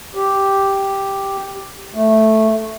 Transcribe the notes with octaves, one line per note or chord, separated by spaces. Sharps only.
G4
A3